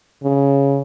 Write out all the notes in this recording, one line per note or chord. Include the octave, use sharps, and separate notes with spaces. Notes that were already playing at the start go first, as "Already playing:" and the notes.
C#3